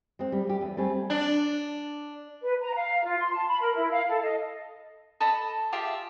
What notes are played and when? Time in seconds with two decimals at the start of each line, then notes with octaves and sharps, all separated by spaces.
0.19 G#3 C4
0.32 G3
0.47 A3 G4
0.61 E2
0.77 G3 A3 C4 G#4
1.10 D4
2.41 B4
2.61 A#5
2.74 F5
3.04 F4
3.19 C6
3.32 A5
3.48 B5
3.61 A#4
3.74 E4
3.91 F5
4.09 A4
4.22 D#5
5.20 A4 D#5 A5 B5
5.72 F4 G4 G#4 E5